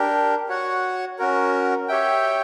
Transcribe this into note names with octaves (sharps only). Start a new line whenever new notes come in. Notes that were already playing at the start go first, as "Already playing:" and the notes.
Already playing: D4 G4 A#4
F#4 C#5 F#5
C#4 F#4 A#4
G4 C#5 E5 G5